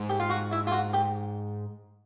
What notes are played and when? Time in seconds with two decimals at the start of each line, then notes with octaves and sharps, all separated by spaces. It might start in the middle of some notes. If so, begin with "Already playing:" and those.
Already playing: G#2
0.10 G4
0.20 F4
0.30 F#4
0.52 E4
0.67 F4
0.72 F#4
0.94 G4